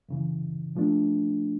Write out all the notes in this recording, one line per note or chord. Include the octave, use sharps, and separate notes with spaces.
F#2 C#3 E3
A#2 F3 A3 D4